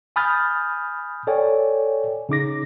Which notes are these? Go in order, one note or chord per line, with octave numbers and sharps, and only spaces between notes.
G#5 B5 D#6 F6 G6 A6
A4 C#5 D5 G5 G#5
C#3 D#4 D6 A#6